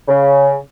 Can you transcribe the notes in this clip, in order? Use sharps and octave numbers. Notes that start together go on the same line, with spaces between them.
C#3